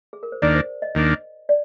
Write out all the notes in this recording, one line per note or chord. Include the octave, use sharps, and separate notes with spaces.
G#4
A#4
C5
D#2 D#3 A#3 D4 D5
C5
D#5
D#2 D#3 A#3 D4
D5